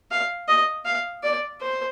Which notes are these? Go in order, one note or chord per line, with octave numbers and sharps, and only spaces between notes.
F5
D#5
F5
D5
C5